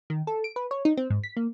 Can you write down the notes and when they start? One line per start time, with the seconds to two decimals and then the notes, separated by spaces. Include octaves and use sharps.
0.10 D#3
0.27 A4
0.44 D7
0.56 B4
0.71 C#5
0.85 D#4
0.97 C4
1.10 G#2
1.24 B6
1.37 A#3